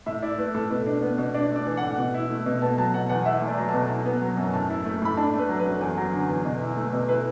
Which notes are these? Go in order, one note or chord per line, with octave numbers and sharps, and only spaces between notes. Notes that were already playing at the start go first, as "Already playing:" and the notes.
A2 E5
E4 D5
A3 B4
A2 A4
B2 B4
D4
B3
B2
D4 D5
A3 D5
E3
A2 F#5
B2
E4
A3
B2
B3 A5
F#3 A5
B2 F#5
E2 F#5
E4 E5
A3
D5
F#3
B2 A5
E4
B3
F#3
F#2
A2 A5
E4
A3
A2 B5
D4 A5
A3
B4
F#3
B4
F#2
E2
F#3
D3
E2
B2
E4
A3
B2
E4 B4